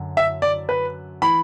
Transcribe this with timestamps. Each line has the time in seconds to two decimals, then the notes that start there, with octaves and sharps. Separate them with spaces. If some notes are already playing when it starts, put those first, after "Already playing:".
Already playing: F#2 D3
0.17 E5
0.42 D5
0.69 B4
1.22 E3 B5